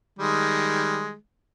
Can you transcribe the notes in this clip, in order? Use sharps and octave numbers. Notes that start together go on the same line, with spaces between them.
D#3 G3 G#3